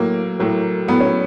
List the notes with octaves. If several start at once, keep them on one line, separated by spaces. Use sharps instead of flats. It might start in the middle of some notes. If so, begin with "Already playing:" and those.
Already playing: A2 F#3 A#3
A2 F#3
A2 F#3 B3
C#4